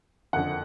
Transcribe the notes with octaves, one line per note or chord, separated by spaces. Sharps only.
F#1 F2 D3 F#5